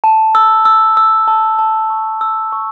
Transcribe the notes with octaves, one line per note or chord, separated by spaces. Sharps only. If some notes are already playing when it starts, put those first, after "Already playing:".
A5
E6
E6
E6
A5
A5
C#6
E6
C#6